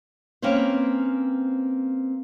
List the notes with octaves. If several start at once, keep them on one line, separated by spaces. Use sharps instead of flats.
A#3 C4 C#4 B4 C5